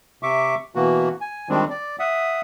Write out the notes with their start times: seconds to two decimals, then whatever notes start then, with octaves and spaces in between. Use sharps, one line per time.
0.23 C3 E5 C#6 D6
0.75 B2 E3 A#3 F#4
1.21 G#5
1.49 D#3 F3 G3 G#3 C4 D4
1.70 D5
1.99 E5 F#5 D#6